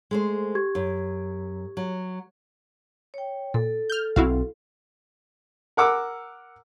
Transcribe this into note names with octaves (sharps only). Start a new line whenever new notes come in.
G#3 A3 C5
G4 C#6 G#6
F#2
F#3
C#5 G5
A#2 A4
F6 G6
B1 B2 C4 E4 F#4 F5
A#4 F#5 D6 E6